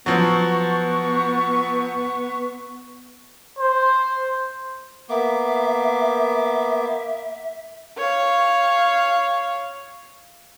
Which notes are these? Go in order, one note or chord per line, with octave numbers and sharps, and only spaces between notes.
F3 F#3 B3 C#6
C5
A#3 B3 E5 D6
C#5 F5